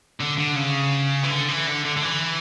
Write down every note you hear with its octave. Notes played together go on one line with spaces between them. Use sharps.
D3
D3
C#3
E3
D3
E3
D3
D3
D3
E3